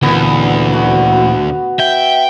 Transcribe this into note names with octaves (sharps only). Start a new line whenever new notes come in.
D2 A#2 E3 B3
F#4
E5 G5